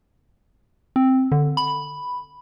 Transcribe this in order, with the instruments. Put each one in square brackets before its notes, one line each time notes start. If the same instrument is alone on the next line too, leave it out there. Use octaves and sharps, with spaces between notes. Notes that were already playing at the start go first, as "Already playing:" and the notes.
[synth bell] C4
D3
B5